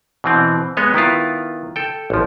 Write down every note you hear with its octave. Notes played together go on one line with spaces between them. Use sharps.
B2 E3 C4
G#3 B3 C#5 D#5
D#3 B3 E4 F4
A4 G5
A1 F3